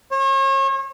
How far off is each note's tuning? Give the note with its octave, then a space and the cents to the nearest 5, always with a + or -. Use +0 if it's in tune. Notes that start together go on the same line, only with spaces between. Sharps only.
C#5 -40